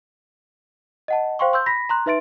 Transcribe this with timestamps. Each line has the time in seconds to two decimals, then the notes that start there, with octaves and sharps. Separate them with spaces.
1.08 D#5 F#5 A5
1.39 C5 F5 G5 C6 C#6
1.53 C6 E6 G6
1.66 B5 A#6 B6
1.89 A#5 C6 F#6
2.06 D#4 B4 E5 C6 A6 D7